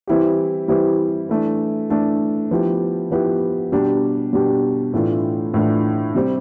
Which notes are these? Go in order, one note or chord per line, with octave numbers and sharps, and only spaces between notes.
E3 G3 C4 E4 G4
E3 G3 C4 E4 G4
E3 A3 D4
E3 A3 D4
F3 B3 E4 G4
F3 B3 E4 G4
B2 G3 D4 G4
B2 G3 D4 G4
A2 E3 A3 D4 F4
A2 E3 A3 D4 F4
C3 G3 C4 G4